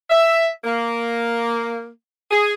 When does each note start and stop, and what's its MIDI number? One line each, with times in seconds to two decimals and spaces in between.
0.09 0.48 76
0.64 1.89 58
2.30 2.52 68